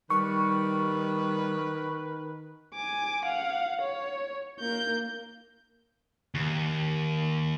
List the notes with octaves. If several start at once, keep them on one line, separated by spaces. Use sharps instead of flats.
D#3 G3 B4 C#6
G#5 D6
F5 F#5
C#5
A#3 G6
D#2